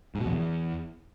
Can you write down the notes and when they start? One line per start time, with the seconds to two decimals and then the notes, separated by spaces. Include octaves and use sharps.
0.15 G#2
0.20 B2
0.26 F2
0.32 E2